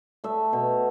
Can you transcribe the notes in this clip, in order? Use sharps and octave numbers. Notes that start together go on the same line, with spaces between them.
A3 E5
B2